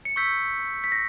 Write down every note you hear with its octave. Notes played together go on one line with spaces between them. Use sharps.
C#7
C#6 E6 G6 B6
B6
A#6